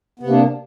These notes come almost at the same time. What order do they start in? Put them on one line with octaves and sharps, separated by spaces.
B3 C3 A#3 D4